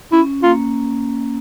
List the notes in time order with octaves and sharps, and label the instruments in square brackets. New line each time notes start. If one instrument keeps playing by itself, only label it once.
[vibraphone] C#4 [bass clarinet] E4
[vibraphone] A#3 [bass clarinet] F4